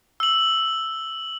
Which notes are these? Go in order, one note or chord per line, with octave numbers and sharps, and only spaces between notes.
E6 F#7